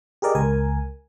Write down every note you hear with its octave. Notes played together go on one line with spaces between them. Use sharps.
G4 G#4 A#4 D5 D#5
C#2 A#4 G#5